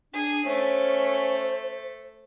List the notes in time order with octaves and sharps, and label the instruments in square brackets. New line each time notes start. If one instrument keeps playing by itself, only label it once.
[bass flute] D4 [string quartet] G#4
[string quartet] A3 [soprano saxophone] C#4 [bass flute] C5